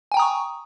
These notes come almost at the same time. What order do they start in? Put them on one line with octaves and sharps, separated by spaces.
G#5 G5 A#5 D#6 C#6